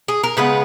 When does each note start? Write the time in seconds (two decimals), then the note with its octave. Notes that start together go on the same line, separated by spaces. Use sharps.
0.08 G#4
0.24 A#4
0.37 C#3 G#3 B3 B4